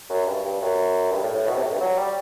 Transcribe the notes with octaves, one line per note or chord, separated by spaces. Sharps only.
F#2
G2
G2
F#2
G2
A2
A2
B2
C3
A2
G2
F#3
G3